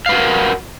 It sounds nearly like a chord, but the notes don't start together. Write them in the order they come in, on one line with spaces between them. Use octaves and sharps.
F5 B4 F#4 A#4